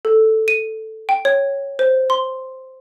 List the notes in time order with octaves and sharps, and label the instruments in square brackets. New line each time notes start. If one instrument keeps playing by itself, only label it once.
[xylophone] A4
D#7
G5
C#5
C5
C6